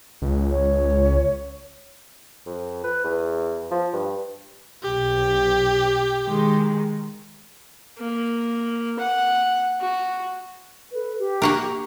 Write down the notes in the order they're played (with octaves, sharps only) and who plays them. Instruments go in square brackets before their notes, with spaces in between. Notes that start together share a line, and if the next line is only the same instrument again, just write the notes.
[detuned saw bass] C#2
[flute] C#5
[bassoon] F2
B4
E2
F3
G2
[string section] B1 [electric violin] G4
[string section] D#3 G#3
[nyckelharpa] A#3
F#5
F#4
[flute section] A4 B4
G4
[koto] A#3 F#4 A#4